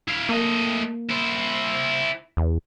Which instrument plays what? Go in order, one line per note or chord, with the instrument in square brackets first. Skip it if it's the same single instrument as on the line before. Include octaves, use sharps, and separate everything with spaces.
[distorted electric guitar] E4 F5
[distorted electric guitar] A3 D#5 [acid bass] A#3
[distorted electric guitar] E4 C5
[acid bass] E2